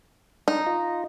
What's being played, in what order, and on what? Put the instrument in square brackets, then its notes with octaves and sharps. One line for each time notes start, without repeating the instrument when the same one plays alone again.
[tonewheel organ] D4 [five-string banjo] D#4
[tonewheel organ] F4 D#5